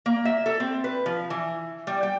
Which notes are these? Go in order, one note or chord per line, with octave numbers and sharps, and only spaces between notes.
A#3
E5
A4
C4
B4
F3
E3
G3
G5